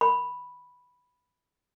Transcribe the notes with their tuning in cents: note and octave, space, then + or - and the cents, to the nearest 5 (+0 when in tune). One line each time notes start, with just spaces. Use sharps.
B5 +0